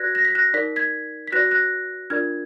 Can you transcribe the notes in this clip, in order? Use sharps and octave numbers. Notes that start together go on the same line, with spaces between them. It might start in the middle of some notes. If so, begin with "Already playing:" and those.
Already playing: F#4 B4 D5 F#6 G#6 A#6
A#6
B6
F#6 A#6
D#4 A#4 D5 B6
G#6 B6
B6
F#4 B4 D5 F#6 A#6
F#6 A#6
D4 F4 A#4 D5 F6 G#6